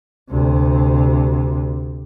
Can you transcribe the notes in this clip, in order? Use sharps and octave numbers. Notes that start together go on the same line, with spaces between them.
D2 C3